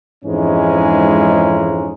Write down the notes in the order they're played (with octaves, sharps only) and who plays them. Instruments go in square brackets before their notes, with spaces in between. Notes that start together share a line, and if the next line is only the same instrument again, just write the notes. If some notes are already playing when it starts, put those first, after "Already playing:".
[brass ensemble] F2 G#2 E3 G#3 C#4 D#4